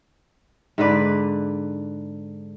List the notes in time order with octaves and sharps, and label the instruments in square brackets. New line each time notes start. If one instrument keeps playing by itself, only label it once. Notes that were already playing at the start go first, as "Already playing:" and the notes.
[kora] G#2 D3 B4 D5